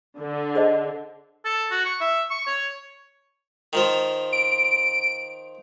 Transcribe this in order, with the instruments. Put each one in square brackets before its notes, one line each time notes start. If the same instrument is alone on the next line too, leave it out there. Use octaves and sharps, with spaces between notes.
[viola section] D3
[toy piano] G#4 C5 D#5
[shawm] A4
F#4
C#6
E5
C#6
C#5
[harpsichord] D#3 F3 F4
[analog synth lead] D7